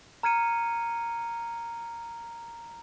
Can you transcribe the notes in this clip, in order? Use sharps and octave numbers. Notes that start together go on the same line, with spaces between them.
A#5 F6 G#6 C#7 D#7